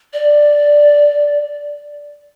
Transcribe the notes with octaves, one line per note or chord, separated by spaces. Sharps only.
D5